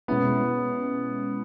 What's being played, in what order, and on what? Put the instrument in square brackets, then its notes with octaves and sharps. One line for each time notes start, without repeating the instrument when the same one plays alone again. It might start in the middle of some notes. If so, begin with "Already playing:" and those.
[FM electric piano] B2 G#3 C#4 E4 [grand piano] B3